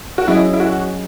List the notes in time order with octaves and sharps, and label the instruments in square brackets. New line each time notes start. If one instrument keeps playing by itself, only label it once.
[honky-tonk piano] F#4
[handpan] F#3 C#4 G#4 D#5 [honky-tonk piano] E4
[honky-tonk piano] E4
F#4